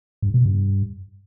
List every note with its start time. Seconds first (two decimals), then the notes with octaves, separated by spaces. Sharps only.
0.22 G2
0.34 B2
0.46 G2